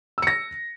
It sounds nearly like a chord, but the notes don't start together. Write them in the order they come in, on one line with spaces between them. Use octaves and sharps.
E6 C#7 A#6